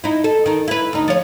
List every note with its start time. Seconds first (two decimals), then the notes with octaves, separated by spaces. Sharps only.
0.04 D#4 E4
0.24 A4
0.46 D#3 D#4
0.68 E4 B4
0.93 D2 D#4
1.08 F3 C#5